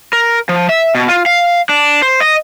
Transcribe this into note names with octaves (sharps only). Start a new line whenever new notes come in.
A#4
F3
E5
B2
F4
F5
D4
C5
D#5